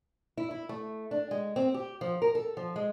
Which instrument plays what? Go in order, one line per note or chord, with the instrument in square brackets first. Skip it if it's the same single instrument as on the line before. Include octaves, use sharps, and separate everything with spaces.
[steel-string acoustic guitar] E4
E4
A3
D4
G#3
C4
G4
F3
A#4
A4
F3
G#3